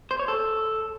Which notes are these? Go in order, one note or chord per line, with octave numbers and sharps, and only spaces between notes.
C5
C#5
A4